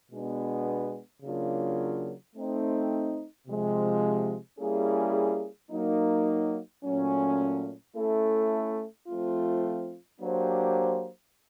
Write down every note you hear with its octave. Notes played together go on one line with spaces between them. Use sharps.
B2 G#3 B3 D4
C#3 F#3 A#3 D4 F4
A3 C4 D#4
C3 F3 G#3
G3 A#3 C#4 E4 G#4
F#3 A#3 D#4
A#2 F#3 A3 C#4
A3 C#4 E4 A4
F3 A3 C4 F4
F#3 A#3 D4 G4 C5